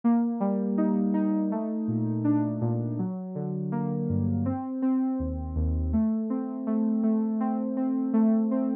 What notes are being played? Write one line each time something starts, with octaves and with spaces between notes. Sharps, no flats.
A#3
G3
D#4
D#4
A3
A#2
D4
A#2
F#3
D3
A#3
G2
C4
C4
D#2
D#2
A3
C4
A3
A3
C4
C4
A3
C4